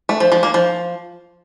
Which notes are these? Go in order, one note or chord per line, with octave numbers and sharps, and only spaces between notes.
A3
F3
F3
A#3
F3